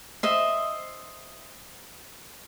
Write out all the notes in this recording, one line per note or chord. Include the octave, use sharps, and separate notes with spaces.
C5 D#5 E5